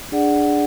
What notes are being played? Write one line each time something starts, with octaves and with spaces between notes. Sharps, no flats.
D4 G#4 D5 F#5